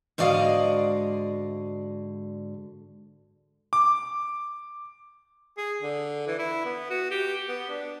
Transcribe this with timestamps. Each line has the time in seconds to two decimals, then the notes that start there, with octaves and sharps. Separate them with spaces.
0.18 G#2 D3 F#4 D5 D#5 F5
3.73 D6
5.57 G#4
5.81 D3
6.27 E3
6.39 E4
6.65 B3
6.90 F#4
7.11 G4
7.48 B3
7.69 D4